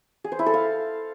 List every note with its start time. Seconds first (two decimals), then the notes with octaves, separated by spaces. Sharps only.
0.24 G#4
0.32 C5
0.39 E4
0.46 A4
0.54 F5